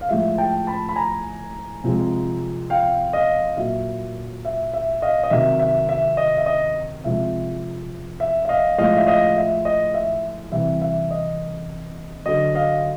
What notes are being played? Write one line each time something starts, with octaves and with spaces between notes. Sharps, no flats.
F5
A2 F3 G#3 E5
G5 A5
A5 B5
B5
G#5 A#5
C3 F3 G#3
F5 G5
D#5 F5
A#2 F#3 E5
E5
E5
D#5 F5
D#5
C3 D#3 F#3 E5
E5
E5
D#5
E5
D#5
C3 F3 G#3 E5
E5
E5
D#5 F5
A2 F3 G#3 D#5 F5
E5
D#5 F5
E5
D#5
E5
C3 E3 G3 E5
E5
D#5
D3 F#3 D#5
D#5 F5